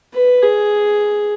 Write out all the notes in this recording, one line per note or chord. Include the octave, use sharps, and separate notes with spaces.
B4
G#4